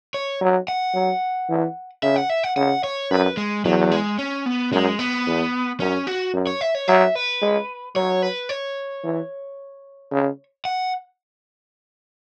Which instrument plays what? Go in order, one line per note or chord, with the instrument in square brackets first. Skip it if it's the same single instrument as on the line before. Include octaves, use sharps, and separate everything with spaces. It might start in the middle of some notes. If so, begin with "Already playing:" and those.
[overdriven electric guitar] C#5
[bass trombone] F#3
[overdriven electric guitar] F#5
[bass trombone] F#3
E3
[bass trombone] C#3 [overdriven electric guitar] E5
[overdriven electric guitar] F#5
E5
F#5
[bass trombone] C#3 [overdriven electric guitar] F#5
[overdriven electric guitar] C#5
[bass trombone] F#2 [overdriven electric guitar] B4
[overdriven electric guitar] G#3
[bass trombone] E2 [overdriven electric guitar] F#3
[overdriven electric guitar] G#3
C#4
B3
[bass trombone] F#2 [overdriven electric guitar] G#3
[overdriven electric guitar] B3
[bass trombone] E2
[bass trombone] F#2 [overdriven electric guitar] C#4
[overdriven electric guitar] F#4
[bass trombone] F#2
[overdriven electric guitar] C#5
E5
C#5
[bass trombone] F#3 [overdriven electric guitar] E5
[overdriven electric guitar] B4
[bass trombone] G#3
[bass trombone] F#3 [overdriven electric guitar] C#5
[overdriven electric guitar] B4
C#5
[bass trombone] E3
C#3
[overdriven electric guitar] F#5